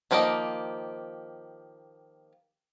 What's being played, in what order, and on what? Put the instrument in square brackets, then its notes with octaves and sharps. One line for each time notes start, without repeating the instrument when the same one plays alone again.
[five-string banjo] D#3 F3 A#3 G4 D#5